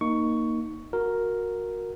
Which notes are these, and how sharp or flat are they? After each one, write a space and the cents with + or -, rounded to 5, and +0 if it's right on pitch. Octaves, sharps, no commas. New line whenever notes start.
A#3 +0 D#4 +0 C#6 +10
F#4 -20 A#4 +0